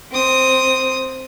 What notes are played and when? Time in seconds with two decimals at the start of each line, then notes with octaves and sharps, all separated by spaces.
0.12 C4 D#6